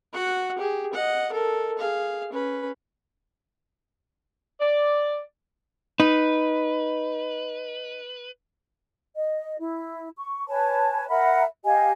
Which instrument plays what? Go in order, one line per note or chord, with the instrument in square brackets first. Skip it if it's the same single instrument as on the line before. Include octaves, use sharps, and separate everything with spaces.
[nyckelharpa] F#4 F#5
G4 G#4
D#5 F#5
A4 A#4
G#4 F5
C#4 B4
[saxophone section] D5
[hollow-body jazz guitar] D#4 [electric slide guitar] B4
[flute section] D#5
E4
C#6
B4 C#5 G#5 A5
A#4 E5 F#5 B5
G4 D#5 F5 G#5